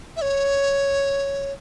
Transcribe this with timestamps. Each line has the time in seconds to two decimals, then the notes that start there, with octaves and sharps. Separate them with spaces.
0.17 E5
0.22 C#5